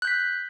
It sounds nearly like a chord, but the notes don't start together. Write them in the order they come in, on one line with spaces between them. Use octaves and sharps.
F#6 G6 B6